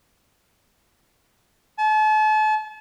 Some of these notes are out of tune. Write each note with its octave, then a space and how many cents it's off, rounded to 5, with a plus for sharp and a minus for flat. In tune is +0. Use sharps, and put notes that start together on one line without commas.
A5 -40